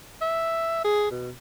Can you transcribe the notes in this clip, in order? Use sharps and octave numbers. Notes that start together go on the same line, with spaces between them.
E5
G#4
B2